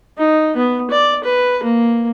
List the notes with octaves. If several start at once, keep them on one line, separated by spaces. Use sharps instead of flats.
D#4
B3
D5
B4
A#3